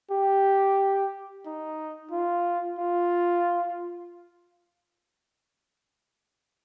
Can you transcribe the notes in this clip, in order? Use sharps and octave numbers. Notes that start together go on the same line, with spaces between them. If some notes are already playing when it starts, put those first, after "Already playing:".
G4
D#4
F4
F4